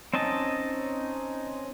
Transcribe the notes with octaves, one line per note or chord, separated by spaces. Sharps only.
C4 C#4 D#4 D#5 A5